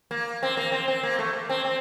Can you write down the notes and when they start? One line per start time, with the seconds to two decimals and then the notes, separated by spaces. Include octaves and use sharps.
0.11 A#3
0.43 C4
0.57 A#3
0.72 C4
0.88 C4
1.03 A#3
1.19 A3
1.33 A#3
1.49 C4
1.65 C4